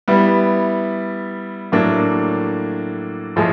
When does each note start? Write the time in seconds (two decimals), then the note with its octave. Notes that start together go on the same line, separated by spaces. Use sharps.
0.08 G3 B3 E4
1.72 A2 F#3 A#3 D4
3.36 A2 F3 G#3